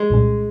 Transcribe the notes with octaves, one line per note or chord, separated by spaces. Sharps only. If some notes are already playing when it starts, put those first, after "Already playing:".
Already playing: G#3
C2 A#2 G3 C#4